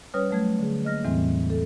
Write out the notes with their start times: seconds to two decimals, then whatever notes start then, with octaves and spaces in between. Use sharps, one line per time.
0.14 G3 C#4 B4 C#5 D#6 F6
0.31 F#3 A3 G#6
0.59 D3 G#4
0.84 A#3 D#5 F6 A#6
1.04 E2 A2 E3 G3 C4
1.50 A4